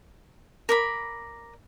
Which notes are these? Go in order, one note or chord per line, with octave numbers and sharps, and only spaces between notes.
A#4 D5 B5